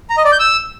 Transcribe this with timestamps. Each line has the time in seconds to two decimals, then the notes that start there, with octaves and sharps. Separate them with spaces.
0.10 A#5
0.17 D#5
0.25 D5
0.32 G6
0.40 E6